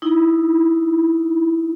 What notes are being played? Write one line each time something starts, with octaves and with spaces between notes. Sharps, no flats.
D#4 E4